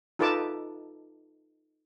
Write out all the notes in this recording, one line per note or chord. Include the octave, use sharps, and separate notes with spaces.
D#4 F4 A4 B4 A5 D6